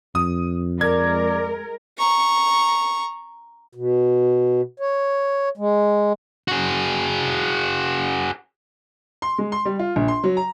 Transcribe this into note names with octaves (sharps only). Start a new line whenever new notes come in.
F2 D#6
G#3 A#4 D5 G#6
A#5 C#6
B2
C#5
G#3
F#4 G#4
C6
G#3
C6
G3
F4
A#1
C6
F#3
A#5